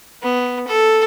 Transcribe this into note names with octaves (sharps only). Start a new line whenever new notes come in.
B3
A4